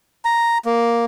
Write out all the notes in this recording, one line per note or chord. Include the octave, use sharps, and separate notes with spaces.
A#5
A#3